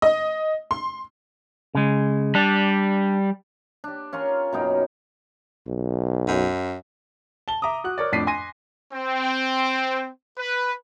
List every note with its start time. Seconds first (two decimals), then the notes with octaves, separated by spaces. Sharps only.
0.02 D#5
0.71 C6
1.75 C#3 G#3
2.35 G3 D4
3.84 D4 G4
4.13 C#4 F4 A#4 C6
4.52 F#2 B2 D#4 G5
5.67 B1
6.28 F#2
7.48 A5 G7
7.62 E5 A#5 D6 D#6
7.84 F#4 F#6
7.98 A#4 C#5 D5
8.12 F2 A2 D4 B6 C7 D#7
8.27 G#5 C6 A#6 D#7
8.93 C4
10.38 B4